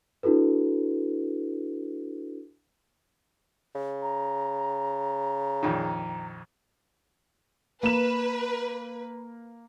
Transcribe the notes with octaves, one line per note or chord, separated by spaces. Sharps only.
D4 E4 F#4 A4 B4
C#3
A#5
A#1 F2 D#3
A#3 B4 E7